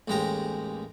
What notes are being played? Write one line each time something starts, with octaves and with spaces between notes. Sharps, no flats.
A1 D#2 G#3 G4 A#5